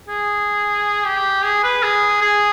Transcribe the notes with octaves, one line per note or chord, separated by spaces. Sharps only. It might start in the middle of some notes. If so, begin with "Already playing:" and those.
G#4
G4
G#4
B4
G#4
G#4